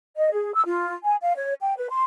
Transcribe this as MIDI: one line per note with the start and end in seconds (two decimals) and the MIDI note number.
0.16 0.29 75
0.31 0.53 68
0.54 0.62 88
0.66 0.93 65
1.04 1.15 80
1.22 1.33 77
1.37 1.53 73
1.60 1.73 79
1.77 1.87 71
1.89 2.03 84